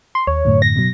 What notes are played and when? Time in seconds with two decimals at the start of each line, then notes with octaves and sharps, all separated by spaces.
0.15 C6
0.27 D#2 C#5
0.45 F#2 A2 D3
0.62 A#6
0.76 B2 F#3